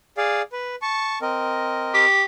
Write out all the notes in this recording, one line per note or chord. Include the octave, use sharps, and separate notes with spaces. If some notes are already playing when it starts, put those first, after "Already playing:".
G#4 D5 F5
B4
A5 C#6
C4 A#4 D#5
G4